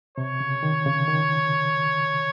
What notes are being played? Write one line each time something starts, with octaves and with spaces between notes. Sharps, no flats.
C3 C#5
C#3
D#3
C#3
D#3